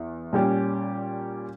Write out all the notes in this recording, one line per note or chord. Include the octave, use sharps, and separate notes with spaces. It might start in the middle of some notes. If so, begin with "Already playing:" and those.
Already playing: E2
A#2 G3 C#4 G4